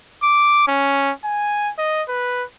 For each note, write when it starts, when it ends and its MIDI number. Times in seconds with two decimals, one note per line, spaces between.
0.23 0.67 86
0.68 1.11 61
1.24 1.71 80
1.78 2.03 75
2.09 2.44 71